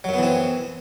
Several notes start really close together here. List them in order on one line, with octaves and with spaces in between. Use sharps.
F#3 F#2 B3 E3 C4